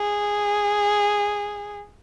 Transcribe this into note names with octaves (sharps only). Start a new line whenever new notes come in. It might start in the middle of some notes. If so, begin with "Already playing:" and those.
Already playing: G#4